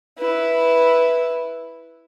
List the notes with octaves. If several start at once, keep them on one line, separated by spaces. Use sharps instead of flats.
E4 B4